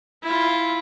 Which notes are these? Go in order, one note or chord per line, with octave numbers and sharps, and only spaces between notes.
E4 F4